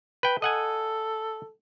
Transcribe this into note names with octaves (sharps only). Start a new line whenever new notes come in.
B4 G5
A4 D#5 F#5 G#5